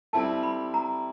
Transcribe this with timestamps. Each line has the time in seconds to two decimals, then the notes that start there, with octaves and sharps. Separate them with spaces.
0.13 G3 C4 E4 A4 A5
0.43 B5
0.74 A#5